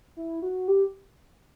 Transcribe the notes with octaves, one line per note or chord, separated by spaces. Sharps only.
E4
F#4
G4